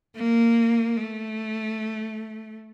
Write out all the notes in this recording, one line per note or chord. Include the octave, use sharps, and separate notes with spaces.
A#3
A3